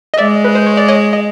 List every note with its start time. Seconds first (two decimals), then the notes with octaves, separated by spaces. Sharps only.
0.14 D#5
0.18 G#3 D5 E5
0.44 B4
0.55 C5
0.66 C#5
0.77 D5
0.88 C#5 D#5
1.13 D#5